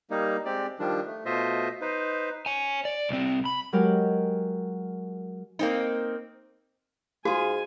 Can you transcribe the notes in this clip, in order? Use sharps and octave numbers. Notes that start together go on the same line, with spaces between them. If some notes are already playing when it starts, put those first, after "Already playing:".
G3 A#3 D#4
G#3 C4 G4 D5
D#3 F3 G3 D4
A3
B2 A3 F4 C5 D#5 E5
D#4 B4 C5
C#5 G#5
D5
C2 C4
B5
F#3 G#3 G4 A#4
A#3 C4 D#4
G#2 F4 F#4 G#4 G#5